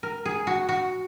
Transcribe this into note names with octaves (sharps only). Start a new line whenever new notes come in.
A#4
G#4
F#4
F#4